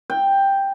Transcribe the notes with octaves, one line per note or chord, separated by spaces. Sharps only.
G5